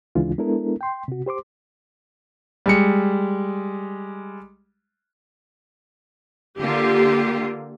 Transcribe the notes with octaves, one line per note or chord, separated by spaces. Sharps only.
D2 C#3 E3 G#3 D4 F4
G#3 B3 D4 E4 A4 A#4
G5 C6
C3 F#4
G4 C5 C6 D6
G3 G#3 C#7
D3 A#3 F4 G4